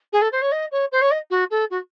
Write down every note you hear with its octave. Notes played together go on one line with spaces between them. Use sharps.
G#4
A4
C5
C#5
D#5
C#5
C5
C#5
D#5
F#4
A4
F#4